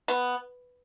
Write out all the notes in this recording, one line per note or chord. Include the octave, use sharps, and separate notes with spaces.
B3